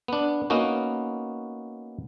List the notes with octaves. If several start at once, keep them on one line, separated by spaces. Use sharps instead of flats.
B3 D4
A#3 B3 C#4 D#4 F#4